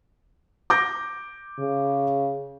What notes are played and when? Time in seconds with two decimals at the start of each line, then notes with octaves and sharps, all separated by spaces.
0.70 D6 G6 A#6
1.59 C#3